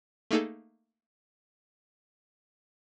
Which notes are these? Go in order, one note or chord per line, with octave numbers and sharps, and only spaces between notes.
A3 A#3 D#4 G#4 A4